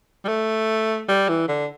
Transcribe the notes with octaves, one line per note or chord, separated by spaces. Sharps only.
G3
A3
G3
E3
D3